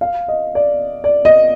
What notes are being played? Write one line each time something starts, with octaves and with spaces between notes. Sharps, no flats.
F5
D#5
D5
D5
D#5